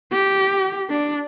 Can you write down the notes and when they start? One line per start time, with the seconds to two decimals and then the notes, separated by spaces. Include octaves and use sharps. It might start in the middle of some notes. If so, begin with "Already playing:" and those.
0.12 G4
0.90 D4